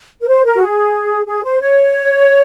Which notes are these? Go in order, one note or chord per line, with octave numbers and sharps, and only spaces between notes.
A#4
C5
A#4
F#4
G#4
G#4
C5
C#5